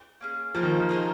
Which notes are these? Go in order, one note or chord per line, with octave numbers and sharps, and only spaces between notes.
A#3 C#4 G#4
F3 A#3 D#4 G#4 C5
D#3
F3
D#3
A#3 D#4 G#4 C5